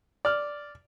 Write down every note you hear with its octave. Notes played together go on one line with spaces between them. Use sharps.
D5 F6